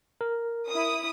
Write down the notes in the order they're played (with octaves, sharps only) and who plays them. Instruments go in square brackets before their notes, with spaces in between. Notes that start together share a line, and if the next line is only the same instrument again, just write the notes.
[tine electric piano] A#4
[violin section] E4 D#6